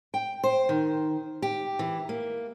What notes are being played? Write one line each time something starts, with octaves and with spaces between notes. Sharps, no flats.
G5
C5
D#3
G4
E3
A#3